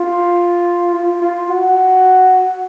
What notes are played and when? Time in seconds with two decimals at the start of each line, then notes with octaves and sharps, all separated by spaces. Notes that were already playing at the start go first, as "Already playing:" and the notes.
Already playing: F4
0.94 F4
1.22 F4
1.49 F#4